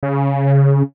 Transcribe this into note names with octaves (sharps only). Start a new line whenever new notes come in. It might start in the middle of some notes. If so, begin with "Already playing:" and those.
C#3